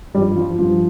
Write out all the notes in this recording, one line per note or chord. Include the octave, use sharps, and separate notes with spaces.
G2 F3 G3
F3
G2 F3